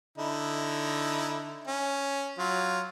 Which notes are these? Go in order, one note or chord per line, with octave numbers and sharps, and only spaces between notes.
D3 D#4 E4
C#4
F#3 F4